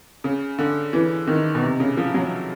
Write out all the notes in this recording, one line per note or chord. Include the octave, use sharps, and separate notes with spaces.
C#3
D3
E3
D#3
B2
C3
C#3
F3
F#3